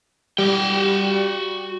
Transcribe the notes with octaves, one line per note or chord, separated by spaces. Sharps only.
G3 F#4 G5